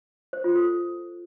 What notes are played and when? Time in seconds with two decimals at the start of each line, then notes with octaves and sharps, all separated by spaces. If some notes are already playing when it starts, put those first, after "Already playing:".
0.33 C5
0.44 F4
0.55 A4